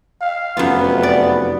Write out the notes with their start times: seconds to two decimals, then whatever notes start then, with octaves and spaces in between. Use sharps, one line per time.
0.21 F5
0.57 F1 F#2 B3 F4
1.03 D5